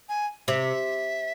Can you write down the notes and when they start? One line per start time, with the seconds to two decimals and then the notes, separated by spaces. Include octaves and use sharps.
0.09 G#5
0.48 C3 E5